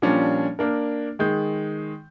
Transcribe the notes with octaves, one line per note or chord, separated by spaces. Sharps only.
A#2 F3 G3 C#4 D4
A#3 D4 A#4
D#3 G#3 G6